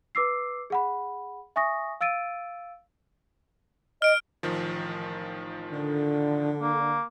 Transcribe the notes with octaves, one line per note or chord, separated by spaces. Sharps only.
B4 D6 E6 C7
G#4 F#5 B5
E5 G#5 C#6 D#6 A#6
F5 E6 A6 D7 D#7
D#5 F6 D7
A1 D#3 F3
D3
A#3